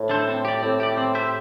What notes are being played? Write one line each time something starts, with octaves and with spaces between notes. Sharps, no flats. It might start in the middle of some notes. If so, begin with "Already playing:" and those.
Already playing: A2
D4 A4 C5
C4
G4 D5
A2 C4
G4 D5
C4
G4 C5 E5